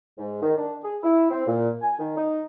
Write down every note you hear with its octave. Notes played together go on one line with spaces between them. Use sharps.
G#2
D#3
D4
G#4
E4
C4
A#2
G#5
D#3
D#4